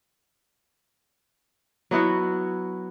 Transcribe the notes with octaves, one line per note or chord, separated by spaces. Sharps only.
F#3 B3 E4 F#4